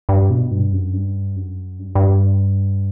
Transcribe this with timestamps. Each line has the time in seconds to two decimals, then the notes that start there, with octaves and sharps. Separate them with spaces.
0.09 G2
0.30 B2
0.51 G2
0.73 F#2
0.93 G2
1.36 F#2
1.79 G2
1.87 F#2
1.95 G2